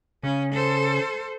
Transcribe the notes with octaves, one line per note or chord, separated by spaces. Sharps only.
C#3 C#4
A4 C5